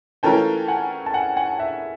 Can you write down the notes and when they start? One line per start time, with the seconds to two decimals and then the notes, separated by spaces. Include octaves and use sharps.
0.23 E3 A3 C#4 F4 A#4 G5 A5
0.68 F#5 G#5
1.06 A5
1.14 F#5 G#5
1.37 F#5 G#5
1.59 E5 F#5